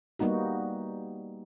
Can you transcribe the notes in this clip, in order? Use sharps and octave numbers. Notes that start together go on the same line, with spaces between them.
G3 A#3 B3 D#4 F#4